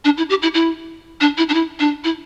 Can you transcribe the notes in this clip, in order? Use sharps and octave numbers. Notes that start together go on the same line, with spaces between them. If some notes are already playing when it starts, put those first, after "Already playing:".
D4
E4
G4
E4
E4
D4
E4
D4
E4
D4
E4